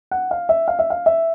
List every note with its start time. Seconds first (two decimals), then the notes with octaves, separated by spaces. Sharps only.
0.11 F#5
0.31 F5
0.49 E5
0.68 F5
0.79 E5
0.90 F5
1.06 E5